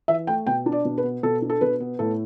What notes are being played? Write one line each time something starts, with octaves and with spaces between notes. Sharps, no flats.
E3 E5
A3 G5
B2 G5
D4
D5
B2
B4
B3
B2 A4
D4
A4
B2 B4
B3
A2 A4